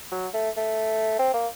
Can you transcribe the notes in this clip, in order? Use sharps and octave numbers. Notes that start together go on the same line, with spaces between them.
F#3
A3
A3
C4
A#3